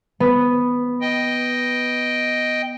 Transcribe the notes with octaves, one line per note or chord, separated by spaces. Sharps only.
B3
D#5 G5